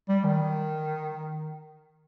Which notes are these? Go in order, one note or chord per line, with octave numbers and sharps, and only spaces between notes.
G3
D#3